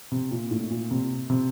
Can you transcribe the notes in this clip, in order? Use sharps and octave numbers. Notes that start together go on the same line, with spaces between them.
C3
A#2
A2
A#2
C3
C3